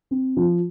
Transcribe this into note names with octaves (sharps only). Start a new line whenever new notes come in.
C4
F3